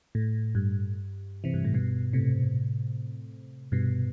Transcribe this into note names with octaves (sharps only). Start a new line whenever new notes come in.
A2
G2
C3 E3
G2
A2
G2 B2
A2 C3
G2 B2